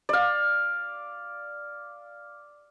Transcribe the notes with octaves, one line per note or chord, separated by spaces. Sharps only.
D5 F5